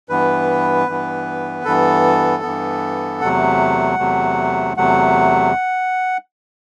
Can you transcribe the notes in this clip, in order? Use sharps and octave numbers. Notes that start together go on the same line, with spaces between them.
G2 E3 B3 B4
G2 E3 B3
G2 E3 B3 A4
G2 E3 B3
E2 C3 F#3 A3 F#5
E2 C3 F#3 A3
E2 C3 F#3 A3 F#5